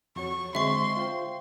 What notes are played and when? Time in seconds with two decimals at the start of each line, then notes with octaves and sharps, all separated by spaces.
0.16 F2 F#4 C#5 C#6
0.55 D3 G#3 C4 E5 C6 C#6
0.97 F4 C5 G5